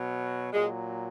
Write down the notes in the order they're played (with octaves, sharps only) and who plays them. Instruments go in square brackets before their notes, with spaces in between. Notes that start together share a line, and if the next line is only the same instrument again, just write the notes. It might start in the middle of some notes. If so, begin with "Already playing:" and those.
Already playing: [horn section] B2 F#3
A#2 F#3 G#3